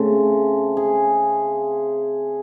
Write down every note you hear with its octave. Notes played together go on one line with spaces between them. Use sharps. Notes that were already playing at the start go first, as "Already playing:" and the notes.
Already playing: C#3 A3 C4 A4
G#4